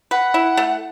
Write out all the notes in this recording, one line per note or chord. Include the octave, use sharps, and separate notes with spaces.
B4 F#5
E4
A3